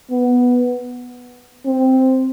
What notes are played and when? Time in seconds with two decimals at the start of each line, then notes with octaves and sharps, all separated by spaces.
0.11 B3
1.66 C4